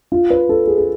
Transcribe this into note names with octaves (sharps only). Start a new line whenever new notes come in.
F4
B4
A4
G#4
G#4